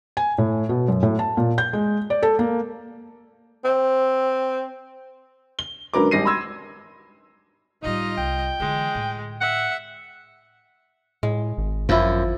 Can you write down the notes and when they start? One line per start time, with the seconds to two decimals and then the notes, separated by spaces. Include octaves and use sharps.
0.17 G#5
0.38 A2
0.69 B2
0.88 F#2
1.03 A2
1.19 A5
1.37 A#2
1.58 G6
1.73 G#3
2.10 D5
2.22 A4
2.39 A#3
3.64 C4
5.59 G7
5.94 C#2 D3 F#3 A#4 B4 D6
6.11 G#1 G3 A#6 C7 D#7
6.25 B5 C6 E6 G#6
7.83 A2 G3 D#4 F4 D#5
8.17 C2 G5
8.60 D3 E3 G#3
8.95 A2
9.41 E5 F#5
11.23 A2 G#3
11.58 G#1
11.89 F#2 F3 E4